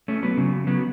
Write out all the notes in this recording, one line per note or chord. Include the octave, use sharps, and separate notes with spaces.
A3 C#4
F#3 B3
C#3 F#3
F#3 B3